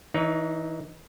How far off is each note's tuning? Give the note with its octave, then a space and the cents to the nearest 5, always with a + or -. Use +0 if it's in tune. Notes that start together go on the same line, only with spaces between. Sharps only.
E3 -25 D#4 +0 C#5 +35